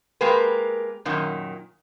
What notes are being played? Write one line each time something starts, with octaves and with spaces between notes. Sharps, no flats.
G#3 A#3 G4 A#4 B4
F#2 A#2 D#3